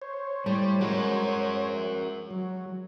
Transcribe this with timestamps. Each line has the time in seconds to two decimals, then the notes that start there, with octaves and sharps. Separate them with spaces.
0.02 C5 C#5
0.46 A2 G3 A3
0.81 G#3 F#4 A#4
2.31 F#3